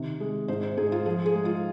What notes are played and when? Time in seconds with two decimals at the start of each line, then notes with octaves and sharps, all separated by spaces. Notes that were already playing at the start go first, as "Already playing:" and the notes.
Already playing: C3 D#3
0.20 G#3
0.48 G#2 C5
0.63 C5
0.77 G#2 G#4
0.92 F4
1.06 F3 G#4
1.26 G#4
1.35 G#3
1.45 F4